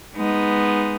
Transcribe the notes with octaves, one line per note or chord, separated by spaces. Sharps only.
G#3 B3 D#4